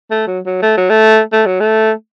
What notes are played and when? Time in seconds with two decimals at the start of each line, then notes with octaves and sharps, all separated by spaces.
0.11 A3
0.27 F#3
0.46 F#3
0.62 A3
0.77 F#3
0.90 A3
1.32 A3
1.46 F#3
1.60 A3